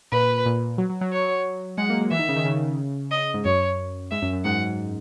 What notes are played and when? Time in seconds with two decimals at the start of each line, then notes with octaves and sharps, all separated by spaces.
0.11 A#2 B4
0.46 A#2
0.78 F#3
0.90 F#3
1.01 F#3
1.12 C#5
1.78 G#3 F#5
1.90 A#3
2.01 G#3
2.11 E3 E5
2.19 D#3
2.29 C#3
2.36 D#3
2.45 C#3
3.11 D#5
3.34 G#2
3.45 F#2 C#5
4.11 G#2 E5
4.22 F#2
4.33 F#2
4.45 G#2 F#5